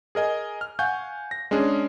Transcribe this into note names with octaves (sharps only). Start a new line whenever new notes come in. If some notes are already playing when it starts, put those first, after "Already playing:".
G#4 A#4 D#5 G#5
F6
F5 F#5 G#5 C#6 G6
A#6
G#3 C#4 D4 G#4